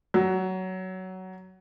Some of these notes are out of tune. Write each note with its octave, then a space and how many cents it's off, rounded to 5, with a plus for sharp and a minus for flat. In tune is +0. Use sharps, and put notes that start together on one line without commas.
F#3 +15